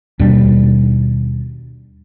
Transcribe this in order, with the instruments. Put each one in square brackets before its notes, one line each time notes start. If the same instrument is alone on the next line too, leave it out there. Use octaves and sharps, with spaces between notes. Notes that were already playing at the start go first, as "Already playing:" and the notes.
[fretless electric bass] D#2 B2 G3 D4